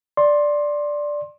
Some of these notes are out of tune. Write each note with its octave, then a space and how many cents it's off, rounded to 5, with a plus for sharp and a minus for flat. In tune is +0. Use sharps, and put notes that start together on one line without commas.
D5 +0 C6 +20